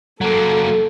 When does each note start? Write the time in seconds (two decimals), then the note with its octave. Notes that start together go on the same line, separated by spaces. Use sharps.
0.21 F#3 A#3 A4